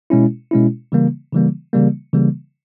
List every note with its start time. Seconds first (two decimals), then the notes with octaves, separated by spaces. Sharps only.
0.10 B2 G#3 C#4 E4
0.51 B2 G#3 C#4 E4
0.92 C#3 E3 G3 A#3
1.32 C#3 E3 G3 A#3
1.73 C#3 E3 G3 A#3
2.13 C#3 E3 G3 A#3